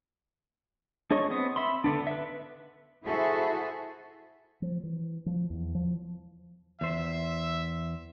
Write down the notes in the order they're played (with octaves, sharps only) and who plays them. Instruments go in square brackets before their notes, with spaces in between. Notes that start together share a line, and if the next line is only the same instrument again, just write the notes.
[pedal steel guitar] D4 G#4 C#5 D#5 C#6
B3 C4 D#6
E5 B5 C6
D3 B3 D4
B4 E5
[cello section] E4 F#4 G#4 A4 C5 E5
[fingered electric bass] F3
E3
F3
E2
F3
[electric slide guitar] E2 C5 [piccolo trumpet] E5